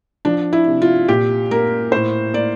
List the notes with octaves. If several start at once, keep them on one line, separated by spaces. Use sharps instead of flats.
F3 D4
E4
C3
F4
A#2 G4
A#3 A#4
A2 C5
A#3 D5